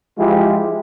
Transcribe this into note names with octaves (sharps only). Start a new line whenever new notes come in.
F3 G#3 E4 F4 G4